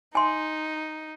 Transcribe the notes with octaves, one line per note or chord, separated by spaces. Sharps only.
D#4 G#5 C6